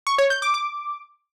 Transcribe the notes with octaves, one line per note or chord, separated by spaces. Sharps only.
C#6
C#5
G6
D6
D6